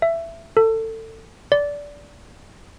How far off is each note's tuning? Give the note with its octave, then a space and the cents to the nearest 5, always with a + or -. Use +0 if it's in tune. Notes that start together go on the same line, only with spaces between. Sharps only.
E5 +15
A4 +25
D5 -15